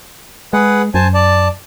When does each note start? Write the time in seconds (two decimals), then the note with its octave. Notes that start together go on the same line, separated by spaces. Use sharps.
0.53 G#3 G#4 B4 F#5
0.94 F#2 C5 G#5 A5
1.14 D5 A5